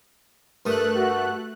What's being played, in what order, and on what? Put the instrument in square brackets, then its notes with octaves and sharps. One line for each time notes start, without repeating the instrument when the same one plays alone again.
[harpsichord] G2 A#4 D#6 [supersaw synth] A3 F#6
[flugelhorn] F#4